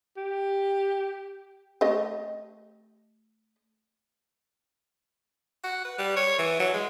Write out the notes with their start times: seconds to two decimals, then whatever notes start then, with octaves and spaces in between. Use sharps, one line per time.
0.17 G4
1.81 A3 G4 D#5
5.64 F#4
5.85 B4
5.98 G3
6.17 C#5
6.38 E3
6.60 F#3
6.74 G#3